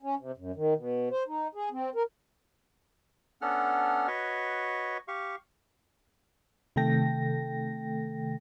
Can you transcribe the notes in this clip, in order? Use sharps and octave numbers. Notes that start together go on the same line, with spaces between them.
C#4
C3
F#2
D#3
B2
C5
D#4
G#4
C4
A#4
B3 C#4 D4 A4 F#5 F6
F#4 B4 C#5 D#5 C#6
G4 F5 C#6
C3 D#3 A3 A4 G5 A#6